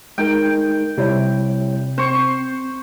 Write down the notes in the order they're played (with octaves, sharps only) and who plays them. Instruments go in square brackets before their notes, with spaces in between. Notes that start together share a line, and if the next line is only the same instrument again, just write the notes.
[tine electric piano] G#3 D#4 A#4 [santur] G5
[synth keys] C3 [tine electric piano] G3 E4 C#5
[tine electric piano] C4 [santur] C5 C#6